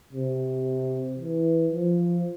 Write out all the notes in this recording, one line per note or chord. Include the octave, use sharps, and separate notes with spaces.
C3
E3
F3